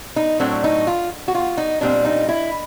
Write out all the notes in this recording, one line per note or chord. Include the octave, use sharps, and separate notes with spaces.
D#4
A2 F#3 A3 C4 D4
D#4
F4
F#4
F4
D#4
A#2 G3 C4 D4
D#4
E4